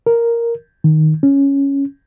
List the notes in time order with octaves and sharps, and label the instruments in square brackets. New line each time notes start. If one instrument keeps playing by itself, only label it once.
[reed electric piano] A#4
D#3
C#4